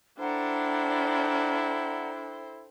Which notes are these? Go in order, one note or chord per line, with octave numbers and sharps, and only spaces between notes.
D4 E4 A4 C5 D5 F#5 G5 A#5